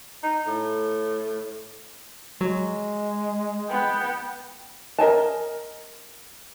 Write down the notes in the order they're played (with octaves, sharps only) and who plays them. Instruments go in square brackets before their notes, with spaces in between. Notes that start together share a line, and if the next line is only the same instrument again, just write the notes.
[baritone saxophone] D#4
A2
[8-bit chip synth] F#3 [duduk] G#3
[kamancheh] B3 [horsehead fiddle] G5
[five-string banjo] A#4 D#5 G#5 A5